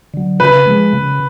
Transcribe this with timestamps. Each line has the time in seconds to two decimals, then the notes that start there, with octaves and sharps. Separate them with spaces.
0.14 D3 F#3
0.39 C#3 B4
0.67 F3 G#3
0.93 C#3